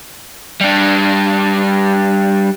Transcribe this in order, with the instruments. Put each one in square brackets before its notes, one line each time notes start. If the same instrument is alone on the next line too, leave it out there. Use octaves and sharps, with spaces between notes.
[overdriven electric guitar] G3 D4